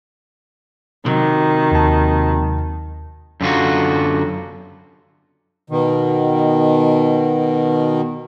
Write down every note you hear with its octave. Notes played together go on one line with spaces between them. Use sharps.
C3 D#3 F#3
D#2 A5
F#2 D3 F4 F#4
B2 D#3